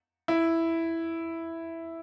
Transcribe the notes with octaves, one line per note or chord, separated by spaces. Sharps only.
E4